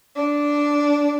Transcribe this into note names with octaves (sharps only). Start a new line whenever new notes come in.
D4